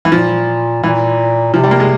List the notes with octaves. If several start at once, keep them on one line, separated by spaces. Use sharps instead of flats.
E3
A#2 F3
A#2 E3
C3 F3
G3
A#3
G#3